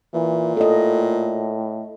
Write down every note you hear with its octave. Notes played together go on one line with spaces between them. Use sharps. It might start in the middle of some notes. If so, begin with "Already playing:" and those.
A#2 E3
A2 A4 D#5